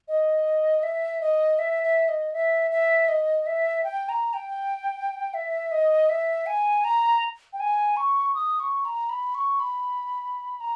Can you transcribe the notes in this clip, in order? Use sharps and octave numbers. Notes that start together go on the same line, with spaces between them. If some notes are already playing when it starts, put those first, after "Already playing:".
D#5
E5
D#5
E5
E5
D#5
E5
E5
D#5
E5
G5
A#5
G5
E5
D#5
E5
G#5
A#5
G5
G#5
C#6
D#6
C#6
A#5
B5
C#6
B5
A#5